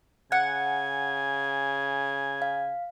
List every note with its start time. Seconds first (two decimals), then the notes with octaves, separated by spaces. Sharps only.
0.32 C#3 F#5 G#5 G#6
2.42 F5